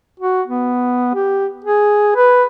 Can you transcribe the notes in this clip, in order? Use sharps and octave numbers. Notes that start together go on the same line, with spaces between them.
F#4
B3
G4
G#4
B4